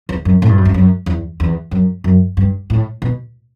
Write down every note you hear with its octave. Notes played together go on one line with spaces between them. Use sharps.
E2
F#2
A2
G2
F#2
G2
F#2
E2
E2
F#2
F#2
G2
A2
B2